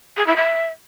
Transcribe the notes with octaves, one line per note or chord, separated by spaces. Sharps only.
G#4
E4
E5